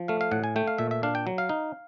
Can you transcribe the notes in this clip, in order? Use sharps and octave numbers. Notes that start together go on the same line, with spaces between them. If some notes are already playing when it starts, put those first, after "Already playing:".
Already playing: F3
A3 F5
F5
A2 F#5
G#5
A3 G5
F5
A#2 E5
E5
D4 F5
G5
F#3
F5
D#4